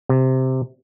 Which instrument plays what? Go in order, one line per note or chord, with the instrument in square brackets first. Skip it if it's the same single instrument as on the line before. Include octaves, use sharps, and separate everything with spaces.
[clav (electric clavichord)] C3